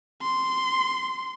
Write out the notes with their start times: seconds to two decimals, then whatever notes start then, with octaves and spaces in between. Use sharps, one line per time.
0.22 C6